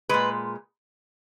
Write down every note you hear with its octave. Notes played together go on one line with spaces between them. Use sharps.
A#2 G#3 B4